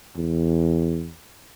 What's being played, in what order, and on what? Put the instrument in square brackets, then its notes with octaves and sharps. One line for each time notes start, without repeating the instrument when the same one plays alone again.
[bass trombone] E2